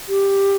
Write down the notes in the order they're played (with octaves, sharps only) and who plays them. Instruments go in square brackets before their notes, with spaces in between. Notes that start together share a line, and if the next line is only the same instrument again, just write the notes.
[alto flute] G4